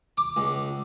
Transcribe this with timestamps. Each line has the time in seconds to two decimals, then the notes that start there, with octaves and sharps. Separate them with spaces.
0.17 D6
0.36 C#2